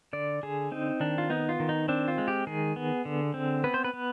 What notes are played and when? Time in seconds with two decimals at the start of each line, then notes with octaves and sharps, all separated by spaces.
0.13 D3 D5
0.43 D3 G#4
0.72 C4 D#4
1.00 D#3 D4
1.18 F4
1.30 B3 D#4
1.49 F4
1.60 D#3
1.69 D#4
1.88 C4 D4
2.08 F4
2.18 G#3
2.28 G4
2.47 D#3 G#4
2.76 B3
3.05 D3
3.34 C4
3.64 B3 B4
3.74 C5
3.84 B4
3.93 B3